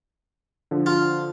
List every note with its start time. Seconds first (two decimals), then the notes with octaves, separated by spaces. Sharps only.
0.71 D3 F3
0.86 F4